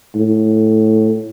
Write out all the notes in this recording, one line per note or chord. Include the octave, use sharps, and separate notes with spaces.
A2